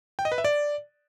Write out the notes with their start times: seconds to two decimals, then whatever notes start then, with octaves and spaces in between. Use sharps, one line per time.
0.19 G5
0.25 D#5
0.32 B4
0.38 E5
0.44 D5